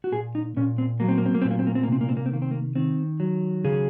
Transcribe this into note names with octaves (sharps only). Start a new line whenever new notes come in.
F#4
A#2 G#4
D#4
A#2 C#4
C4
F#3 A#3
C4
A#3
C4
A#3
A#2 C4
A#3
C4
A#3
C4
A#3
C3 C4
A#3
C4
A#3
C4
D#3 A#3
C4
A#3
D#3 C4
F#3
C#3 G#4